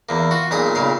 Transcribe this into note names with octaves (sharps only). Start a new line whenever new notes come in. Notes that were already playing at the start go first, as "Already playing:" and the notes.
E2 A#3
F4 F#4
B1 A#2 G#4 D#6
B1 A#2 C#3 F5